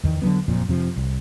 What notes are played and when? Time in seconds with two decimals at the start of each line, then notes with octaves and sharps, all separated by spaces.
0.04 E2 D#3
0.22 D3 F#3 A#3 B3
0.48 F#1 F2 A#2 F3
0.68 F2 C3 F3
0.96 C2